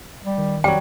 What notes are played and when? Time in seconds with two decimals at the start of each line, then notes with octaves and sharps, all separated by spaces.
0.24 G3
0.38 D#3
0.64 F2 F#3 G3 G5